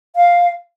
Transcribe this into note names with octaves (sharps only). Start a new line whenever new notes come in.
F5